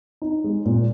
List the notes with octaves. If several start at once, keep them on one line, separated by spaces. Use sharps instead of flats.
D#4
G#3
A#2